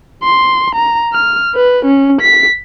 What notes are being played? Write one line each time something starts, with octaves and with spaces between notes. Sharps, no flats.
C6
A#5
F6
B4
C#4
B6